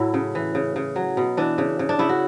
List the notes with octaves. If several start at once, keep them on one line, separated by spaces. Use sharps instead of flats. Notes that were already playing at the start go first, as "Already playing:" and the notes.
Already playing: A2 F#3 E4
C#3
E3
C#3
C#3
F#3
B2
E3 D4
C#3
C#3
D4
C#3 E4
F#4